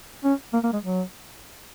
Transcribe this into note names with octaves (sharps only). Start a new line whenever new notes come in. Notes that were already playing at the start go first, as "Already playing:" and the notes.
C#4
A#3
A#3
G#3
F#3